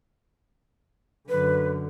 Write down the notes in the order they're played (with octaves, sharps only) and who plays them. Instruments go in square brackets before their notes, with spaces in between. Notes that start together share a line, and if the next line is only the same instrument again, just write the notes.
[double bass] F#2 D3 [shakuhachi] B4